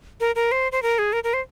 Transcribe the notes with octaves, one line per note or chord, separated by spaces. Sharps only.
A#4
A#4
C5
C5
A#4
G#4
A#4
A#4
C5